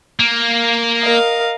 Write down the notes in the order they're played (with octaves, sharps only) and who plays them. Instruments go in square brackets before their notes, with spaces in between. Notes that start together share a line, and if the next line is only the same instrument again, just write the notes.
[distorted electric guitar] A#3
[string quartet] A#4 D#5 F5